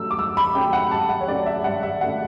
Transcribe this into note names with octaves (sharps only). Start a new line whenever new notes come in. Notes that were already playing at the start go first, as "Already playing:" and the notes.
Already playing: G2 F#3 A3 C#4 E6
D6
G2 E6
B5
F#3 A3 C#4 G5
F#5
G2 A5
F#5
C#5
F#3 A3 C#4 D5
E5
G2 F#5
E5
F#3 A3 C#4 F#5